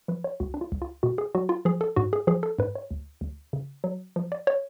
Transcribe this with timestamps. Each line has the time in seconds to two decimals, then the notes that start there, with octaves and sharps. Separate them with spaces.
0.08 F3 B4
0.24 C#5
0.40 C#2 F#4
0.54 D4
0.61 F4
0.72 C#2
0.82 F4
1.03 B2 F#4
1.18 G#4
1.35 F#3 F#4
1.49 F4
1.65 F3 G#4
1.81 A4
1.96 G#2 F#4
2.13 G#4
2.27 F3 G#4
2.43 A4
2.59 G#2 B4
2.75 C#5
2.91 D2
3.21 D2
3.53 C#3
3.84 F#3
4.16 F3
4.32 D5
4.47 C#5